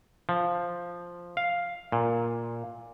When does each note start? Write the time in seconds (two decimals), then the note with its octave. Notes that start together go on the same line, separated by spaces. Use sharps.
0.29 F3
1.37 F5
1.92 A#2